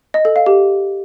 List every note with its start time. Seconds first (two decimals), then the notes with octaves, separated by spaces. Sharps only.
0.14 D#5
0.25 A4
0.36 F5
0.46 G4